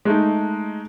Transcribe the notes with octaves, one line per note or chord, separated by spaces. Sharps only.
G#3 A3 D#4